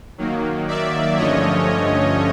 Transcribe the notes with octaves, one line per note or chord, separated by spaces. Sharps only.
D#3 F#3 A#3
D5 E5
G2 D3 F3 A3 C#4 C#5 D#5